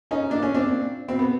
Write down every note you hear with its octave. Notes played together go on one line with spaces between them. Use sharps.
C#4 D#4
A#2 D4
C#4
C4 D4
A#2
B2 C4
B3